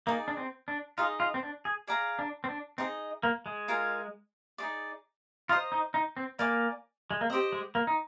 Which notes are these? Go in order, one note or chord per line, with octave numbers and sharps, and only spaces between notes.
A#3 D#4 G#4 D5
D4
C4
D4
D#4 F4 G#4 D#5
F4
C4
D4
G#4
G#4 D5 F5 A#5
D4
C4
D4
C4 D#4 G#4 D#5
A#3
G#3
F4 A#4 F5 G#5
D#4 G#4 D5
F4 C5 D#5 A#5 D#6
D#4
D#4
C4
A#3 D5 G#5 D6
G#3
A#3
C4 G4 C5 D#5
G#3
A#3
D#4